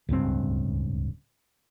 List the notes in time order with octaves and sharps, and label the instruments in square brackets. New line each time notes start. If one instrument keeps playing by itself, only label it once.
[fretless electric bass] D1 C#2 G2 C4